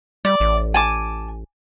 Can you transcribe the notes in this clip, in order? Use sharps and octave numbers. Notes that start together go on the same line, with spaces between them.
G3 D5
A1
G#5 A5 D6